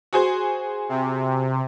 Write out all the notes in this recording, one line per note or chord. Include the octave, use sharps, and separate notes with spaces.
F#4 G#4 C5
C3